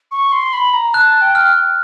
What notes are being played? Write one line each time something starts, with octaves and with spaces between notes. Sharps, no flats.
C#6
C6
B5
A#5
A5 F#6
G5
F6